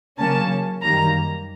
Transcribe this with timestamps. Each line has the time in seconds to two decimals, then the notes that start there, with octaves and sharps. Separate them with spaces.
0.18 C#3 F#3 A#3 C#4 A5
0.82 F#2 D#3 G3 A#3 A#5